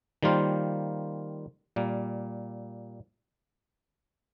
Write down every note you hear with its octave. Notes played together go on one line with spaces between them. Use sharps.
D#3 G3 A#3 F4 C5
A#2 G3 A#3